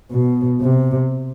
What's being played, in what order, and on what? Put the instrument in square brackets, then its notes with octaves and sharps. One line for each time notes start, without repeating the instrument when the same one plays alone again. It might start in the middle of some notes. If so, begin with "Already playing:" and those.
[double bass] B2
C3